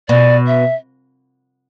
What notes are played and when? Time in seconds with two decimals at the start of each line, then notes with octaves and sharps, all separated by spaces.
0.09 B2 D5
0.47 E5